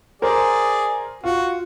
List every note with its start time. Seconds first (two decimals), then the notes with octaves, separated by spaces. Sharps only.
0.22 G#4 A#4 C5 D5
1.24 F4 F#4